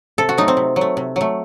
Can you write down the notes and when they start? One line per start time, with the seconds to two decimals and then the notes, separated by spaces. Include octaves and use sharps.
0.18 C3 A4
0.29 F#4
0.38 F#3 A3 D#4
0.48 C4
0.57 C3
0.76 F#3
0.81 A3
0.97 C3
1.16 F#3 A3